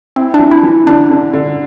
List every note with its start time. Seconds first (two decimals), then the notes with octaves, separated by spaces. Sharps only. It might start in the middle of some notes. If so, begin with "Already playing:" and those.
0.16 C4 E4
0.34 D4
0.39 E3
0.51 E4
0.63 E3
0.86 D3 D4
1.10 D3
1.33 D3